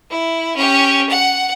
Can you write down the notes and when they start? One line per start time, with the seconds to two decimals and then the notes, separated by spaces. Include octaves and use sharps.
0.10 E4
0.56 C#4 G4
1.09 F#5